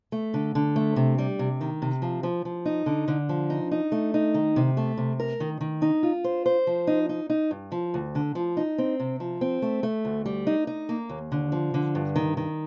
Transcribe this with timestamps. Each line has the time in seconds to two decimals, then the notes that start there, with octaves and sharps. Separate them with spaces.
0.12 A3
0.34 D3
0.55 D3
0.76 A3
0.96 C3
1.18 G3
1.39 C3
1.61 D#3
1.82 C3
2.02 F3
2.23 F3
2.45 F3
2.65 D#4
2.86 D3
3.08 D3
3.29 F3
3.50 D#4
3.71 D#4
3.92 A3
4.14 D#4
4.34 D#3
4.56 C3
4.77 A3
4.97 C3
5.20 A#4
5.40 D#3
5.61 D#3
5.82 D#4
6.03 F4
6.24 C5
6.46 C5
6.67 F3
6.87 D#4
7.09 D#4
7.30 D#4
7.51 G2
7.72 F3
7.94 D2
8.15 D3
8.35 F3
8.57 D#4
8.78 C4
9.00 C3
9.20 F3
9.41 C4
9.62 A3
9.83 A3
10.05 D2
10.26 G3
10.47 D#4
10.67 D#4
10.89 A#3
11.09 D#2
11.32 D3
11.52 F3
11.74 D3
11.95 G2
12.16 D#3
12.37 D#3